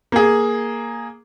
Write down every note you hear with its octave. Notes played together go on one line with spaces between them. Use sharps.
A#3 G#4